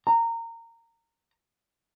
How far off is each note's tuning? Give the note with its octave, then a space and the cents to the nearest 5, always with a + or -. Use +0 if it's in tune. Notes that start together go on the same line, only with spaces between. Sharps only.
A#5 -20